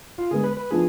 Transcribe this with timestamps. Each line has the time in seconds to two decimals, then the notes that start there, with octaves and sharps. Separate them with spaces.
0.18 F4
0.31 D3 G#3 B3 G#4
0.44 B4
0.57 B4
0.71 F3 B3 D4 G#4